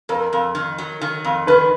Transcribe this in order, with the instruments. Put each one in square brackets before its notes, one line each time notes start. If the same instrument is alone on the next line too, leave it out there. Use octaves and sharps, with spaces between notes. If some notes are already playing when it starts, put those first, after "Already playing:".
[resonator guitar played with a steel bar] F2 [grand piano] A#4
[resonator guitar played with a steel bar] F2
D#3
F#3
D#3
F2
[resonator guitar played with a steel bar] D#3 [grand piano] B4